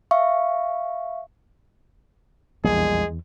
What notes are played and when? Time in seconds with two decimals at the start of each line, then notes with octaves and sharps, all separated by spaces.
0.11 E5 F5 C#6
2.64 A#1 E2 G3 G#3 A#3 G#4